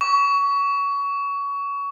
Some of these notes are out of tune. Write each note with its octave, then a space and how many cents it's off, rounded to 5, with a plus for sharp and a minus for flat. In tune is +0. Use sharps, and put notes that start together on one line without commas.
C#6 +25